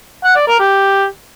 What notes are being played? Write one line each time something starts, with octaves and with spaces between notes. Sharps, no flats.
F#5
D5
A#4
G4